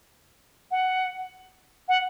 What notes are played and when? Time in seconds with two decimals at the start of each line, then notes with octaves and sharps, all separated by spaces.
0.71 F#5
1.88 F#5